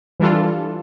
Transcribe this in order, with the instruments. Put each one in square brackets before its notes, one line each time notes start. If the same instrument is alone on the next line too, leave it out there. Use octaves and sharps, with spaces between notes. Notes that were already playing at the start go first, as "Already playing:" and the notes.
[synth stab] E3 G3 D4 F4 A4